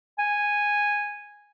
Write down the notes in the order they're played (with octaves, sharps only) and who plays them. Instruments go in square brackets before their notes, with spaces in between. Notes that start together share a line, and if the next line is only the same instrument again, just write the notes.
[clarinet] G#5